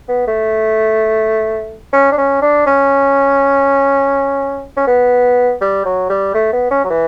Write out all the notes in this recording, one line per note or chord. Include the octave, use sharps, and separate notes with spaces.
B3
A3
C#4
D4
C#4
D4
C#4
C#4
B3
G3
F#3
G3
A3
B3
C#4
F#3
E3